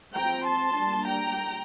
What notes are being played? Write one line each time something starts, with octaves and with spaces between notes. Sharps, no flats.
F3 C4 G5 A#5
A5 C6
G3 A#3 D4
G5 A#5